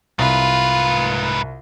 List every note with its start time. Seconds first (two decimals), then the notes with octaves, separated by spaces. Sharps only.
0.19 C2 G#2 F4 B4